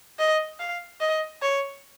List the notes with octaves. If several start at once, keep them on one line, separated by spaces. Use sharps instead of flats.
D#5
F5
D#5
C#5